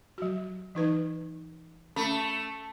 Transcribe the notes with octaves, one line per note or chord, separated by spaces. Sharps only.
F#3 F#4
E3 D#4 B4
A3 C#4